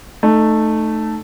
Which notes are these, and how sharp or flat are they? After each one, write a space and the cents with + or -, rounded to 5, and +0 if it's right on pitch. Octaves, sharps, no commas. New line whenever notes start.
A3 +0 D#4 -25